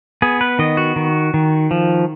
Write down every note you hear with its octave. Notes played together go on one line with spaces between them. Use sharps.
B3 G#4
B4
D#3 D#5
F#4
D#3
D#3
F3